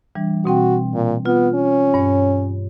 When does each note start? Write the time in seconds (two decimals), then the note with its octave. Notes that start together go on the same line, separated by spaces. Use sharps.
0.15 E3 G3 D4
0.45 B2 C4 F#4 G5
0.94 A#2
1.26 B3 F4
1.55 C#4
1.94 G2 C#5